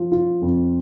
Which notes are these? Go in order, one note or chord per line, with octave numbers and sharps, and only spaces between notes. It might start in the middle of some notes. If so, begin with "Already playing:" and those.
Already playing: F3 F4
F4
F2